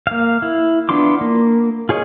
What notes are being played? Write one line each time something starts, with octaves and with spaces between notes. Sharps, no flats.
A#3 F5
E4
B3 D4 F4 C6 D6
A#3
F4 G#4 C#5 D#5